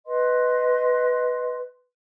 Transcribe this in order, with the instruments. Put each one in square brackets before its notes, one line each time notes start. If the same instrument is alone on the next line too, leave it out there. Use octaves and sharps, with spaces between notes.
[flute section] B4 D#5 C6